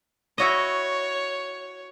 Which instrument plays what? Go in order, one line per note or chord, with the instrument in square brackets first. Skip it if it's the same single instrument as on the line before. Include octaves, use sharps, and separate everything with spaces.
[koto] E4 F#4 D#5 [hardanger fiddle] C#5